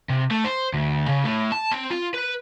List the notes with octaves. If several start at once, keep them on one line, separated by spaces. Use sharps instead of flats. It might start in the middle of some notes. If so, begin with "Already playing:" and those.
C3
A3
C5
D2
C#3
A2
A5
C4
F4
B4